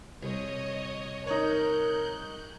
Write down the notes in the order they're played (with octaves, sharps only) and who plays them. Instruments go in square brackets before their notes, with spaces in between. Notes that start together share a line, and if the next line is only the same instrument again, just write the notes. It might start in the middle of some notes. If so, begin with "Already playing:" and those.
[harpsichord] C2 [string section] C#5 D#5
[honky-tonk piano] D#4 C#5 [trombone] A#4 [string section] F#6 G6